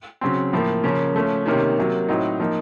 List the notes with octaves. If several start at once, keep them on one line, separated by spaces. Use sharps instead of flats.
C#3 F#3 C4
A2 F3 A#3
C#3 F3 A#3 C#4
F3 A3 C#4
C3 D#3 A#3 C#4
C3 F#3 A#3
A2 F#3 C4 D#4
F3 A#3 D#4